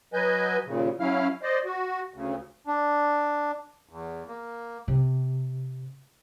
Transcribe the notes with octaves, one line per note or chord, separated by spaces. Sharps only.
F#3 B4 D#5 G#5 G6
D#2 A#2 C#3
F#3 C#4 E4 F5 F6
C5 D5 D#5
F#4
D2 C#3
D4
E2
A#3
C3